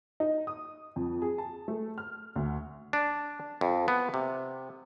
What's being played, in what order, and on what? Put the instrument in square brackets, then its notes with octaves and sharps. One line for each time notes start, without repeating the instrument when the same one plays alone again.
[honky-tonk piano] D#4
D#6
F2
G#4
A5
A3
F6
D2
[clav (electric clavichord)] D4
F2
B3
C3